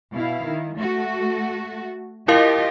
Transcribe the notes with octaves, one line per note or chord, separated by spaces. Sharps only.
B2 E4 F5
D#3
A3 F#4
E4 F4 G4 A#4 D#5 F5